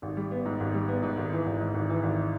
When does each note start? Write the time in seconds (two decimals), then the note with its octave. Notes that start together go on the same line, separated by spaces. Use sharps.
0.02 G#1
0.17 G3
0.31 B3
0.45 G#2
0.60 G#1
0.74 G3
0.88 B3
1.03 G#2
1.17 G#1
1.32 E3
1.46 G#1
1.60 G#2
1.74 G#1
1.89 E3
2.03 G#1